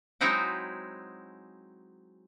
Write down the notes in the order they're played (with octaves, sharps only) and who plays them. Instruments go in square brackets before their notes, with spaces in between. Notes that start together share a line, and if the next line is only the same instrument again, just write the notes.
[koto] F#3 G#3 C4 D#4 E4 F#4